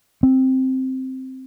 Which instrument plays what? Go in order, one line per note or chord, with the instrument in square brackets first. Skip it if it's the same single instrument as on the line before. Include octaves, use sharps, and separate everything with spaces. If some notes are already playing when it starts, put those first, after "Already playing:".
[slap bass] C4